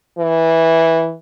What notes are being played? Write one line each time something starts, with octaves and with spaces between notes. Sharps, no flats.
E3